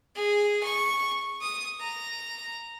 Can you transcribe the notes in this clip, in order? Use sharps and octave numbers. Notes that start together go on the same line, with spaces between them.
G#4
C#6
D#6
A#5